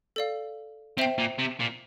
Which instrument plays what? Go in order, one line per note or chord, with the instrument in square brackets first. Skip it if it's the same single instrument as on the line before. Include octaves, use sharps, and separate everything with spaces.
[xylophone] A4 D5 F5
[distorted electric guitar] C3 [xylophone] C5 E5 G5
[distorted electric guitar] A#2
C3
A#2